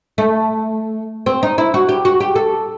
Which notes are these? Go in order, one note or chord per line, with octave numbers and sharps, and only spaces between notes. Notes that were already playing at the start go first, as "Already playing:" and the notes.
A3
C4
D#4
E4
F#4
G4
F#4
G4
A4